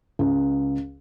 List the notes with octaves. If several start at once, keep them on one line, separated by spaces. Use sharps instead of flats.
C#2